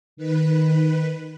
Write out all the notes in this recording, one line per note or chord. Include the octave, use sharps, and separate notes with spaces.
D#3 B4